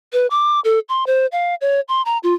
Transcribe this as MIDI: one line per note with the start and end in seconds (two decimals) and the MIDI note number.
0.13 0.27 71
0.30 0.60 86
0.64 0.79 69
0.89 1.06 84
1.07 1.26 72
1.32 1.55 77
1.61 1.80 73
1.89 2.02 84
2.05 2.18 82
2.23 2.34 65